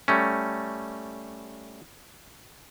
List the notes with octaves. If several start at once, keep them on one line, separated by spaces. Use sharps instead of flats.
G3 A3 C#4